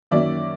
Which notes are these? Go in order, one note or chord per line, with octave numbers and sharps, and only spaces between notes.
F#2 D#3 F#3 A#3 D5 E5